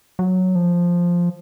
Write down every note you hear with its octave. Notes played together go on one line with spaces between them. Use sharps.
F#3
F3